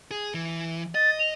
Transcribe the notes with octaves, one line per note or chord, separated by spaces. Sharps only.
G#4
E3
D#5 A6
F7